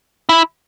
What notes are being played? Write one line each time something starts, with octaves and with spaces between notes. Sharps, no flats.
E4